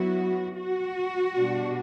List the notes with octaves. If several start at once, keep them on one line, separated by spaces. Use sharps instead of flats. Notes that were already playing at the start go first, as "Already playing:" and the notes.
Already playing: F#3 B3 E4 F#4
F#4
B2 G3 D4